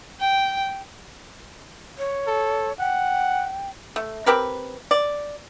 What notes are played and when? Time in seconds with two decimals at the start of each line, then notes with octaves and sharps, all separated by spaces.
0.20 G5
1.98 C#5
2.27 A4
2.80 F#5 G5
3.96 A3
4.26 C4 G4 A#4 B4
4.91 D5